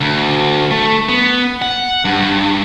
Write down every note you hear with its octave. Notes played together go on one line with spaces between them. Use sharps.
D2
A3
B3
F#5
G2